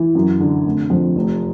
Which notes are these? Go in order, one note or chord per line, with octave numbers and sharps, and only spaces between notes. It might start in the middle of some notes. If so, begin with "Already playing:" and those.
Already playing: E3
F#2
D3
F1
F2
F1